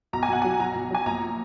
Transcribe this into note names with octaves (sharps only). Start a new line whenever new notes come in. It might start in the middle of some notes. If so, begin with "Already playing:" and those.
B1 A#5
G#5
B1 F#5
F#3 G#5
B1 A#5
B1
F#3 G#5
A#1 A#5